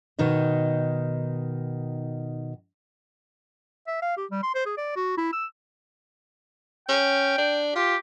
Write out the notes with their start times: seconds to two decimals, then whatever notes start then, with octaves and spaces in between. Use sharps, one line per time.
0.19 B2 D#3 D#4 D#5
3.87 E5
4.02 F5
4.17 G4
4.31 G3
4.43 C6
4.54 C5
4.66 G#4
4.77 D5
4.96 F#4
5.17 E4
5.33 E6
6.89 C#4 G5
7.38 D4
7.76 F4 G4